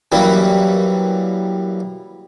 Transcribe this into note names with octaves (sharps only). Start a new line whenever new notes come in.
F#2 E3 G3 A#3